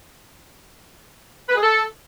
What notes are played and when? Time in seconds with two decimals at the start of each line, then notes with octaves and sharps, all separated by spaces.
1.48 B4
1.55 G#4
1.63 A4